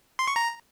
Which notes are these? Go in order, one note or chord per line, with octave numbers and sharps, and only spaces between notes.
C6
C#6
A#5